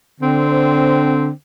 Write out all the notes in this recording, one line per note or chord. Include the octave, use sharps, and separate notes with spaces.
D3 C4